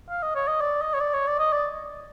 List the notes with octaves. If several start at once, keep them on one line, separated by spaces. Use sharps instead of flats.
F5
D#5
C#5
D#5
D5
D#5
C#5
D5
C#5
D5
D#5
D5